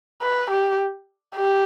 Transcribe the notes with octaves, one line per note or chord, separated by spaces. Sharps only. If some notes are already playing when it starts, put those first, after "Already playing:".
B4
G4
G4